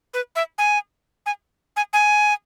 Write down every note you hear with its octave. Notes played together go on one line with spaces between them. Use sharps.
B4
E5
G#5
G#5
G#5
G#5